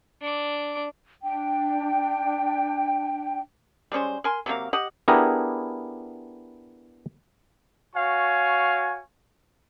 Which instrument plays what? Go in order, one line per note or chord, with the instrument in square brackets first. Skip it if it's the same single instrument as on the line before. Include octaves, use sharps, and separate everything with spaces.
[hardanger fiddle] D4 D6
[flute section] D4 G5
[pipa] G3 G#3 C#4 C5
A#4 G#5 C6
C3 F#3 A#3 F5
G4 D#5 F#5
[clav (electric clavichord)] B3 D4 E4 G4 G#4 A#4
[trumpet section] F#4 C#5 F5 G#5 C#6